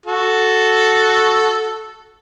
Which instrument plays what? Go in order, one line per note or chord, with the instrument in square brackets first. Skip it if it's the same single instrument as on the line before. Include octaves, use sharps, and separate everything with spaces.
[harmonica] F#4 A4